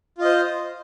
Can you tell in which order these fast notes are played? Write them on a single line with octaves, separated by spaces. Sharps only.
F4 D#5 C5